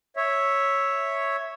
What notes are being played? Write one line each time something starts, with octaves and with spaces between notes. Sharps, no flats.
C#5 E5